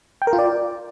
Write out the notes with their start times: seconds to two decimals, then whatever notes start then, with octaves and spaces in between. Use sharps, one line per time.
0.22 G5
0.27 A#4
0.33 F4
0.39 D5